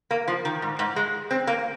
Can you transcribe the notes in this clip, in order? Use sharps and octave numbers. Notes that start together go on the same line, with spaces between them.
A#3
F3
D#3
G#2
G#2
G#3
C4
A#3